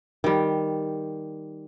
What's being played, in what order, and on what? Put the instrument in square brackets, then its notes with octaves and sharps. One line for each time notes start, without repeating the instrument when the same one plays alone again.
[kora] D#3 G3